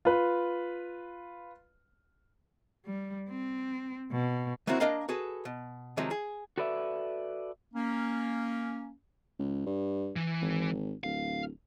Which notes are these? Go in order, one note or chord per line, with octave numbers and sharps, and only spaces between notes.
F4 B4
G3
C4
B2
F#3 A#3 C4 E4 F#4
A#3 D4 A#4 D#5 F5 A#5
F#4 G#4 A4 B4
B2
C3 D#3 F3 F#3 G#3
G#4
F#4 A4 B4 D5 E5
A#3 C#4
C#2
G2
E3
G#1
D1 F5